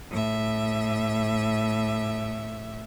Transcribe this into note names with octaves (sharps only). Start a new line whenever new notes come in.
A2 E5